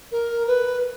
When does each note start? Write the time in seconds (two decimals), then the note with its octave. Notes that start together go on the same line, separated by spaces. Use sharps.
0.11 A#4
0.47 B4